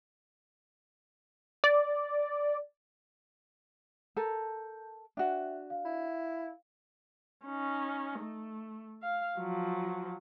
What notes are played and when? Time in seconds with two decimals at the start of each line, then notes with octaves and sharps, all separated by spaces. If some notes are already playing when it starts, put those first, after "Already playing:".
1.64 D5
4.17 A4 A#4 A5 G6
5.17 D4 F#4 E5 G5
5.70 F5
5.85 E4
7.45 C#4 D#4
8.20 A3
9.03 F5
9.39 F3 F#3